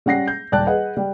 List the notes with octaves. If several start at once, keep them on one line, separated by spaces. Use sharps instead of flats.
G3 C#4 F#5 A#6 C7
G6
D#1 D5 G5 A5 F#6
G#4 B4 D#5 F#5
G3